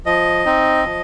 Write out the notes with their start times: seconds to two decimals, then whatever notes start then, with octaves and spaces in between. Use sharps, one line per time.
0.06 F3 D#5
0.45 C4 D#4
0.84 F3